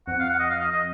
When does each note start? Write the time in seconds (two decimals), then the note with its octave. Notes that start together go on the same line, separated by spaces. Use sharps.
0.07 F2 F#5
0.19 F5
0.29 F#5
0.39 D#5
0.50 F5
0.60 D#5
0.71 D#5